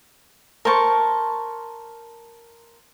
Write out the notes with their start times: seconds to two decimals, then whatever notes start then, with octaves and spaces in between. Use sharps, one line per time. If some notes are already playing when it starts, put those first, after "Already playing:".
0.65 A#4 C5 A5 C#6